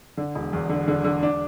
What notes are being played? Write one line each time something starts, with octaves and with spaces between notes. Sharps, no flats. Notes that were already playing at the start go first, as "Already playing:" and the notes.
D3
E1
E2
D3
D3
D3
D4